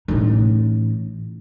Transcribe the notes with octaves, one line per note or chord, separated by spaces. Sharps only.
A1 D#4